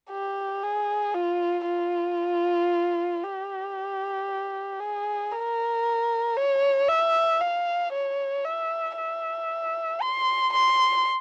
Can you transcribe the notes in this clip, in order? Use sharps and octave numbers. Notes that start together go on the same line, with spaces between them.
G4
G#4
F4
F4
G4
G#4
A#4
C#5
E5
F5
C#5
E5
E5
C6
C6